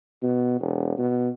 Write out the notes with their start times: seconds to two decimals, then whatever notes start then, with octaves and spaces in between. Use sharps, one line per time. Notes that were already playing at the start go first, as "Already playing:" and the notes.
0.23 B2
0.61 E1
0.98 B2